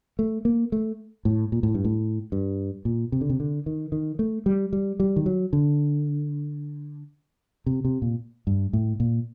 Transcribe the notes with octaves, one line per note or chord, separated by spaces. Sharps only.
A3
A#3
A3
A2
A#2
A2
G2
A2
G2
A#2
C3
D3
C3
D3
D#3
D#3
A3
G3
G3
G3
D#3
F#3
D3
C3
C3
A#2
G2
A2
A#2